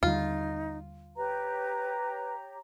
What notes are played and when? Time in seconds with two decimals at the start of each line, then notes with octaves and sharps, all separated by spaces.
0.03 D#2 D3 G3 D#4 F4
1.17 G4 B4 C#5 A#5